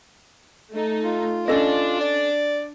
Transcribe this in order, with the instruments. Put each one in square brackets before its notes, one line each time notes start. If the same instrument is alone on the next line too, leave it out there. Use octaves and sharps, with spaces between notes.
[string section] A3 D#4
[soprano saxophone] F4
[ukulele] C#4 A4 D#5 [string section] D4
[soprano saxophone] D5